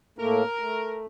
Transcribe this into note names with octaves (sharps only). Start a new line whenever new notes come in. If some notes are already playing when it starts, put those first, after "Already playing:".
A2 A3 A#3 A#4
A3